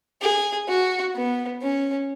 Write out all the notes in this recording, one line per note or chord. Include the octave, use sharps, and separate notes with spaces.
G#4
F#4
B3
C#4